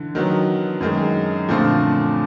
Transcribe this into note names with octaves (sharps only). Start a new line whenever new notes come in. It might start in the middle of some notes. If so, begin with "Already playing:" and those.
Already playing: D3 E3
D#3 F#3 B3
F#2 D#3 G#3
A#2 D3 F3 A3 C4 F4